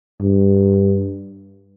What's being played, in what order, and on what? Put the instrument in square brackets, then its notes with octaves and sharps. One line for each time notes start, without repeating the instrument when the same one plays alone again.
[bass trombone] G2